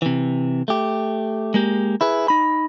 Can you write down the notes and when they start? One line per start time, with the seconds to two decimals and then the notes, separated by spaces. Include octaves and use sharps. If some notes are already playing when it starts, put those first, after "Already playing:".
0.02 C3 E3
0.68 A3 G4
1.54 G#3 A#3 G4
2.01 E4 G#4 B4
2.28 D#4 B5